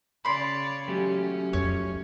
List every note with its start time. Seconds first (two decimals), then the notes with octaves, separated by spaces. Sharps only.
0.25 C#3 C#5 D5 B5 C6
0.88 F#3 A3 C#4 G4
1.53 F1 F2 C#5